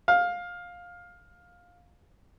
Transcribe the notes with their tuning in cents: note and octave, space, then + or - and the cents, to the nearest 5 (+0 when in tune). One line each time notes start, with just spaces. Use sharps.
F5 +15